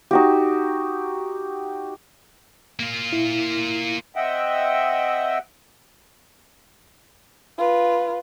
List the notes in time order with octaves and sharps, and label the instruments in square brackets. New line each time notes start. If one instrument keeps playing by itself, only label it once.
[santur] D#4 F#4 G4
[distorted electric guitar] A#3 F4
[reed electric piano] E4
[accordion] C4 D#5 E5 F#5 G5
[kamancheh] F4 B4